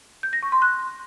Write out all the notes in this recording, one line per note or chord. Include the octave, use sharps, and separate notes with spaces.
G6
A#6
C#6
C6
F#6